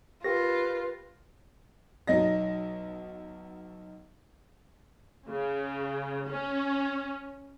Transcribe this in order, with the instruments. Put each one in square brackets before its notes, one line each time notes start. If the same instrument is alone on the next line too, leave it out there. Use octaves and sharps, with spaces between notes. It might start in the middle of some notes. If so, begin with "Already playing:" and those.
[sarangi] F4 [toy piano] G4 A#4 G5 [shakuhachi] B4 [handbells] A#6
[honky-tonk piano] B1 F#3 D#4 D#5 A#6
[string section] C#3
C#4